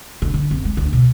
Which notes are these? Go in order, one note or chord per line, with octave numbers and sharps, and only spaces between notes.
D3
D3
F2
G#3
D2
B2